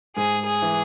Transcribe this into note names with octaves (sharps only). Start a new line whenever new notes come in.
G#2 G#4
G#4
E3